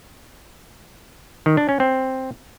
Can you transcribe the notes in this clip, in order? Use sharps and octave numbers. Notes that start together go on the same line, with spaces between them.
D#3
D4
C#4
C4